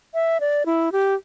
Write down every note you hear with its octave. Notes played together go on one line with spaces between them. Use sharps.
E5
D5
E4
G4